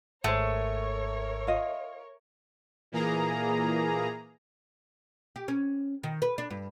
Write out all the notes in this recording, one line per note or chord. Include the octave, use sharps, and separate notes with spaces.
G#1 G#2 A3 G#4 A#4 C5 C#5
F4 D#5
A#2 E3 A#3 G#4 A#5
G4
C#4
D#3
B4
D4
G2